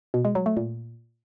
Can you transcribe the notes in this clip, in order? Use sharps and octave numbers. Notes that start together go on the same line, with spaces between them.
B2
G#3
F#3
A3
A#2